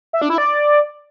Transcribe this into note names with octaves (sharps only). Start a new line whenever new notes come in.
E5
D4
E4
D5